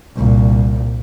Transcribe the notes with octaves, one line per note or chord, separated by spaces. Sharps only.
C2 A#2